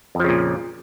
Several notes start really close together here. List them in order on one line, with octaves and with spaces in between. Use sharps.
F2 F3 C#3 A#2